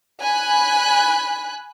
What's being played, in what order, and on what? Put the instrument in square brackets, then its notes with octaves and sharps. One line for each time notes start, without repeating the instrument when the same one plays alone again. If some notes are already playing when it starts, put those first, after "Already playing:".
[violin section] G#5 B5 F#6